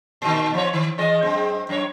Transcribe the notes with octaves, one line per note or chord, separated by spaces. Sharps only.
A#2 D#3
F3 C4 C#5
D#3
E3 G#3 D#5
F#2 G#3 C4
F#2 C#5